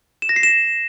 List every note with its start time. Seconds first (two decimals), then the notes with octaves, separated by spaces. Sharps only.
0.22 E7
0.29 A#6
0.36 C7
0.43 E7